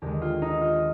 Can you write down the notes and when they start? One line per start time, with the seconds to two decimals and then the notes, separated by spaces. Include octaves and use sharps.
0.02 D#2 D3 G#3 G4
0.22 F4
0.42 D#4
0.61 F4